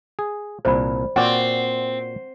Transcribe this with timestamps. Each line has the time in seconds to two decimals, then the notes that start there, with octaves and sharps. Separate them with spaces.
0.19 G#4
0.65 C2 A#2 A#4 C5 D5 B5
1.16 A#2 C4 F#4 D5 F#5